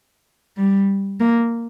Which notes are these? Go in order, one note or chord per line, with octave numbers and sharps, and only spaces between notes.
G3
A#3